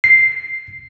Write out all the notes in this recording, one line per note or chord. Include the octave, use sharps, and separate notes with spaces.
C7